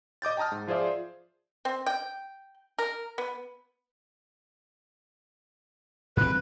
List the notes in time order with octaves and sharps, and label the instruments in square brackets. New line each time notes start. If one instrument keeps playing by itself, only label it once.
[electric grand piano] D#5 D6 G6 A6
G5 A5 A#5 D#6 F6
G#2
F3 F4 G#4 C5 D5 E5
[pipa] C4
G5
A#4
B3
[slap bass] G2 E3 C4 [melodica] B4